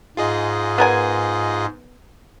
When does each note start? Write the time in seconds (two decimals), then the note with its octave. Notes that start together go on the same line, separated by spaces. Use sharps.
0.17 G#2 F4 G#4 D#5
0.78 B3 A#4 G#5